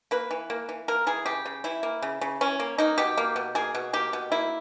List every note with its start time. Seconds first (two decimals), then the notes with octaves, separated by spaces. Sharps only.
0.11 A#3 B4
0.31 E3
0.50 A#3
0.69 E3
0.88 A#3 A#4
1.07 E3 G#4
1.26 C#3 G4
1.46 C#3
1.64 E3 E4
1.83 A#3
2.02 C#3
2.21 C#3
2.41 E3 C#4
2.60 A#3
2.78 A#3 D#4
2.98 B2 G4
3.17 A#3
3.36 B2
3.55 A#3 G#4
3.75 B2
3.93 A#3 G4
4.13 B2
4.32 A#3 E4